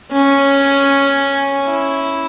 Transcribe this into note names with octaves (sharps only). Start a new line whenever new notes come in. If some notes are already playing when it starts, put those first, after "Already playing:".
C#4
E4